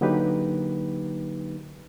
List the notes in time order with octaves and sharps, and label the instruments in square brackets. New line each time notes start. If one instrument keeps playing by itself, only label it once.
[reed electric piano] D3 F#3 A#3 D#4 G4 B4